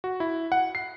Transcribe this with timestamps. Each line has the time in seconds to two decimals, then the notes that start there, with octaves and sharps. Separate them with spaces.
0.04 F#4
0.20 E4
0.52 F#5
0.75 C7